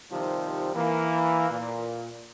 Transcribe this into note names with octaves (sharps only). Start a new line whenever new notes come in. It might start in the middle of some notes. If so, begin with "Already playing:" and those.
C3 D#3 F3 G3
E3 A#3
A#2